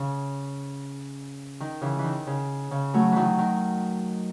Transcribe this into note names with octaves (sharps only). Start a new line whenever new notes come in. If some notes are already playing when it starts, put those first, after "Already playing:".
Already playing: C#3
D#3
C#3 E3
E3
D#3
C#3
C#3
F#3 A3
D#3 E3 F#3
D#3